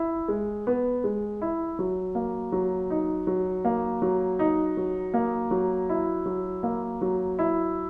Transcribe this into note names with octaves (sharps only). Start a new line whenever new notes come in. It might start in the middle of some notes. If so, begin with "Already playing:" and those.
Already playing: E4
G#3
B3
G#3
E4
F#3
A#3
F#3
D#4
F#3
A#3
F#3
D#4
F#3
A#3
F#3
E4
F#3
A#3
F#3
E4